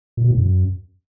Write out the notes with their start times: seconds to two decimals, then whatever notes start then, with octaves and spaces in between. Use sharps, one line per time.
0.17 A#2
0.24 B2
0.31 A2
0.38 F#2